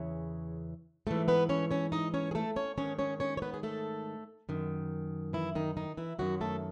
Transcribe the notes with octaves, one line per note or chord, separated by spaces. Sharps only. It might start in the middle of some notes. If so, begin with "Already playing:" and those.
Already playing: E2 C#3 E3 C#4
G#2 E3 A3 A4
B3 B4
C#4 C#5
C#4 C#5
D#4 D#5
C#4 C#5
G#4
A3 A4
C#4 C#5
G#2 D#3 C#4 C#5
C#4 C#5
C#4 C#5
C#5
B3 B4
G#4
A3 A4
F#2 D#3
E3 E4
D#3 D#4
D#3 D#4
E3 E4
F#2 D#3 F#3 F#4
A3 A4